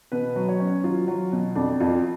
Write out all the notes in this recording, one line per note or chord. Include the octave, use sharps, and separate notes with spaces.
B2 B4
F#3
C#5
C#4
F#3 F4
F#3
B2
F2 D4
F2 F4